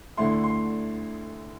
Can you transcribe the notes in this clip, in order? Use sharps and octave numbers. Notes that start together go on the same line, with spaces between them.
D2 D3 A3 E4 C6
C6